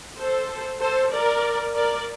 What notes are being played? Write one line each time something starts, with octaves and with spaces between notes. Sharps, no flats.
A4 C5
A4 C5
A#4 D5
A#4 D5